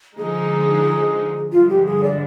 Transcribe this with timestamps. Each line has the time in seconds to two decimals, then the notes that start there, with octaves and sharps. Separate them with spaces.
0.17 D3 F3 G#3 D#4 G#4
1.52 G2 D3 F3 G#3 F4
1.69 G4
1.86 G#4
2.04 D5